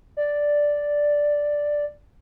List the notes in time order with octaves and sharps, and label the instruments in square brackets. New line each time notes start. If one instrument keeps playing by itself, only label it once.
[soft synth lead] D5